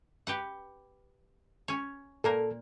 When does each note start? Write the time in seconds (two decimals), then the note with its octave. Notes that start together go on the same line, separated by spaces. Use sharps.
0.27 G4 B4 F#5
1.68 C#4 C#5
2.24 A#2 A#3 A4 A#4